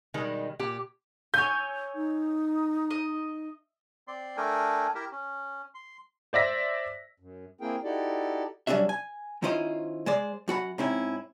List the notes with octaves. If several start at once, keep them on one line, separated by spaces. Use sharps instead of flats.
B2 D#3 G3 G#3
A#2 G4
C#5 G#5 G6
D#4
D#5
C4 D5 C6
A3 D4 A4 A#4 G5 G#5
E4 G4 A#4 E5
C#4
C6
C5 D5 E5 A#6 B6
F#2
A#3 C4 E4 G#4 A#4 G5
D#4 E4 F#4 G4 A4 D5
F#3 G3 C#4 D4 F#4 E5
G#5
D#3 C#4 E4 F4 C5 D#5
G#3 C5 D5
F#2 F#4 F#5 B5
G#2 C4 C#4 E4